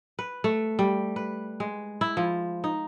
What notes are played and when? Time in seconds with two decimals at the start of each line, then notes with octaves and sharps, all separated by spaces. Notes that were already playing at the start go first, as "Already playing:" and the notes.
0.19 B4
0.44 A3
0.79 G3
1.16 B4
1.60 G#3
2.01 E4
2.17 F3
2.64 D#4